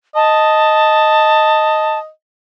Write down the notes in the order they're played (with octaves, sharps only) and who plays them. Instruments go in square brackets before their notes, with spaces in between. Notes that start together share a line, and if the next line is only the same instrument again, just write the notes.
[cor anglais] D#5 [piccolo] A5